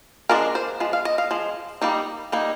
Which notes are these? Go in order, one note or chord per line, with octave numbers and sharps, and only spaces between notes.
F3 G#3 D4 A#4
C5
F3 G#3
F5
D#5
F5
F3 G#3
G3 A#3 D#4
G3 A#3 D#4